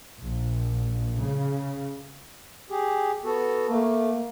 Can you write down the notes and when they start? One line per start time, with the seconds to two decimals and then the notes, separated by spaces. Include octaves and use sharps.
0.22 A#1
1.20 C#3
2.70 G4 G#4
3.24 B3 F#4 A4
3.70 A3 A#3